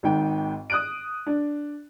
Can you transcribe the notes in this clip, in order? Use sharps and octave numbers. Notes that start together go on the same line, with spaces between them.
G#1 G#2 G5
D#6 F#6 D7
D4